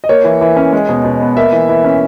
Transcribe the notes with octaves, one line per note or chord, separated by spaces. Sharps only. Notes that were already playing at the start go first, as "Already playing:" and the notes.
D#5
A#3 C#5
E3
E3
C#4
G#3
B2
B2
B3
A#3 E5
E3
E3
C#4